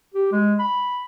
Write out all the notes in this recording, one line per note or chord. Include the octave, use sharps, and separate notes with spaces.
G4
G#3
B5